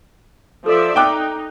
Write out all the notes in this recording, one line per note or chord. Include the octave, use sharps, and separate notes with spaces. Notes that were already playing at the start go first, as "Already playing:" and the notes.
F3 A4 D5 E5
D#4 G5 D6 F#6